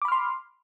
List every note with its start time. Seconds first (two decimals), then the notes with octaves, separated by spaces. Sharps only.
0.02 D6
0.05 B5
0.08 F6
0.12 C6